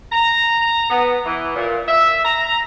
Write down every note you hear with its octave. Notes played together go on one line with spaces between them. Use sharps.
A#5
B3
E3
A#2
E5
A#5